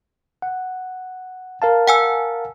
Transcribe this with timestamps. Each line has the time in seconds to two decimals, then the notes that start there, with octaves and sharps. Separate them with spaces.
0.42 F#5
1.62 A#4 F5 A5
1.88 F#5 G#5 E6